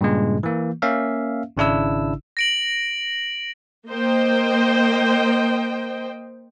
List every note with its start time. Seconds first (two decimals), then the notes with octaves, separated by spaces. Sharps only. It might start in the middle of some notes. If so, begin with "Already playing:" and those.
0.01 G2 A#2 C#3 G#3
0.43 E3 A#3
0.82 A#3 C#4 E5 F5
1.57 G#1 C#3 D4 E4 E6
2.37 A#6 D7 F#7
3.87 A#3 C5 D#5 G5